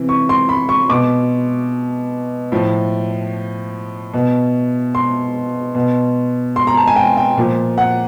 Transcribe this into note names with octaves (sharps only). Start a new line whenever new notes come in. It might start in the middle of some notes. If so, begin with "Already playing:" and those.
Already playing: C3 E3
C#6
C6
B5
C#6
B2 D6
A2 F3
B2
C6
B2
C6
A#5
A5
G#5
G5
G5
A#2 F3
F#5